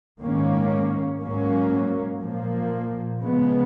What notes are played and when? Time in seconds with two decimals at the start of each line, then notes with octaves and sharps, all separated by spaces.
0.20 G#2 D#3 A#3 C#4
1.20 G#2 F#3 A#3 C#4
2.20 A#2 F3 A#3
3.20 C#3 F3 G#3 B3